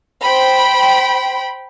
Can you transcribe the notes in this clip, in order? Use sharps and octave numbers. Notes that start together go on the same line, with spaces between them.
C5 G5 B5